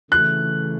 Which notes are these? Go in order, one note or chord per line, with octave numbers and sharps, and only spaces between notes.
C#3 E3 A3 F#6